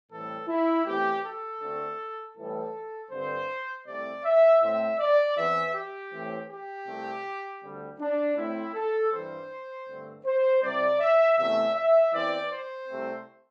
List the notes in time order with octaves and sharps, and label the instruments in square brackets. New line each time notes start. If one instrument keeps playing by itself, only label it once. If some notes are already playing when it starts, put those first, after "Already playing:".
[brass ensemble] A2 E3 G3 C4 A4
E4
E2 E3 A3 C4 G4
A4
D2 D3 A3 C4
A2 E3 G3 A4
G2 D3 C4 C5
C2 C3 A3 C4 D5
E5
A2 A3 C4 E5
D5
E2 E3 C4 E5
G4
A2 E3 C4
G4
C2 C3 A3 C4
D2 D3 G3 C4
D4
A2 A3 C4 E4
A4
G2 E3 G3 C4 C5
G2 D3 A3 C4
C5
C2 C3 G3 C4 D5
E5
E2 C3 A3 E5
E5
E2 E3 C4 D5
C5
C2 C3 A3 C4